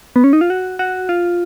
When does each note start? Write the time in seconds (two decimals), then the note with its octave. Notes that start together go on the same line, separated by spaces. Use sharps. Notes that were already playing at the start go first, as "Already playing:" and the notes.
0.16 B3
0.24 C#4
0.33 D#4
0.41 F4
0.50 F#4
0.79 F#4
1.09 F4